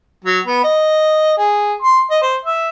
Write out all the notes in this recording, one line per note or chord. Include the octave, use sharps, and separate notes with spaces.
F#3
B3
D#5
G#4
C6
D#5
C5
E5